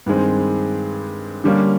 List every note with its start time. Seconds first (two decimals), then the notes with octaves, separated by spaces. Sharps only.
0.06 G2 D#3 G#3 C4
1.44 D3 G3 A#3 C#4